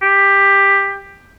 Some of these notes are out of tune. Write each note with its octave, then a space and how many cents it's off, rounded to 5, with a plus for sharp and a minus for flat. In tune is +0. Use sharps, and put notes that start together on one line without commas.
G4 +15